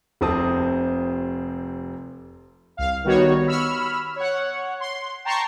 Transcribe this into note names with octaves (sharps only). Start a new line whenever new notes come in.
F1 C3 C4 A5 D#6
C2 F5
D#3 G3 B3 D#4 F#4 C#5
B5 C#6 E6 F6
C#5 F#5
C6
G5 A5 A#5 C6 C#6 C7